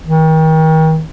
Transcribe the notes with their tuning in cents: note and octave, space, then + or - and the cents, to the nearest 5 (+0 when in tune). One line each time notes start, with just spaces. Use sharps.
D#3 +35